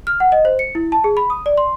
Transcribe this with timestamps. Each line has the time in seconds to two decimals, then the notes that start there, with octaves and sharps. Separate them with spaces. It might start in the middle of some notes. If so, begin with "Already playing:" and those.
0.07 F6
0.20 F#5
0.32 D#5
0.45 C5
0.59 C#7
0.75 E4
0.92 A5
1.04 G#4
1.17 B5
1.30 D#6
1.46 D5
1.57 C6